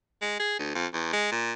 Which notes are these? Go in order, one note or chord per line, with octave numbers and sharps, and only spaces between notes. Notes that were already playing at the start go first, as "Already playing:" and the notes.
G#3
G#4
D2
F2
E2
G#3
A#2